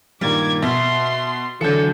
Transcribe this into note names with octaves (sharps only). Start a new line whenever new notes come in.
G2 A#2 D#3 G3 D6 G#6
B2 E5 C6 C7
D3 E3 F#3 A4 G6 C#7